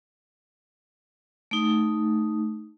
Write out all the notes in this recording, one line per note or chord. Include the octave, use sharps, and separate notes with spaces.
A3 D#4